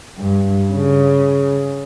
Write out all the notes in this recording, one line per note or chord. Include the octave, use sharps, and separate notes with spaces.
G2
C#3